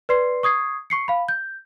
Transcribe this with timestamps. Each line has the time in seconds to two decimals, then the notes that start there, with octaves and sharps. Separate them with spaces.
0.09 B4 D5 C6 C7
0.43 C#6 D#6 G#6 C7
0.90 C#6 C7 C#7
1.08 F5 B5
1.29 G6